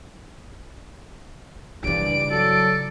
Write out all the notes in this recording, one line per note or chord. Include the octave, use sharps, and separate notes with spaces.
G2 C#3 E3 D5 D7
F#3 A4